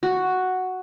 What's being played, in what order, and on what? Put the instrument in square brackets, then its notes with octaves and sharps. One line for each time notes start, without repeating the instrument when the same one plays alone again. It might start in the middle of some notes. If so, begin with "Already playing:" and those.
[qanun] F#4